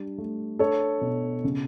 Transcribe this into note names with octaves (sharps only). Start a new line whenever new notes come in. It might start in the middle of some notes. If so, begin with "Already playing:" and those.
Already playing: G3 D4
A3
D4 A4 C#5
B2
C#3